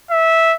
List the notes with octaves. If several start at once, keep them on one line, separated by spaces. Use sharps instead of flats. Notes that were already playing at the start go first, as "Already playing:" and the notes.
E5